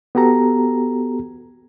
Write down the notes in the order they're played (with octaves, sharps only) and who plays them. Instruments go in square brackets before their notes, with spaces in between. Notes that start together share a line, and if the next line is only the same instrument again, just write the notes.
[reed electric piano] B3 F#4 G4 A4 A#5